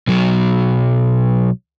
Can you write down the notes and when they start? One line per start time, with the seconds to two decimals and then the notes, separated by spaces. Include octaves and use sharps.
0.08 B1 F#3